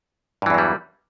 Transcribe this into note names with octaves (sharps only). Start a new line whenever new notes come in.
E2 G2 E3 F#3 G3